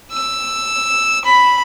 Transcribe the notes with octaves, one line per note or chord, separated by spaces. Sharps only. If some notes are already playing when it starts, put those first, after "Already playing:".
E6
B5